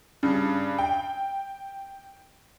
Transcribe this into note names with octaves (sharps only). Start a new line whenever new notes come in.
G2 C#3
G5